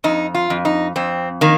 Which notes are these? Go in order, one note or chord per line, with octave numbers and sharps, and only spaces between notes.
F2 D#4
F4
F2
D#4
F2 C4
D#3 A#3